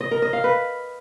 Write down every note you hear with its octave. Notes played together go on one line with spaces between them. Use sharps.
D#5
A#4
D#5
F5
B4